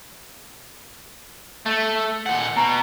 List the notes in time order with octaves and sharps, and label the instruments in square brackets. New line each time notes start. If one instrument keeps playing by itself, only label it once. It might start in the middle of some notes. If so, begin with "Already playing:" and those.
[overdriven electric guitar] A3
A#2 F#5
[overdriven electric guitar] B2 [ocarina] A#5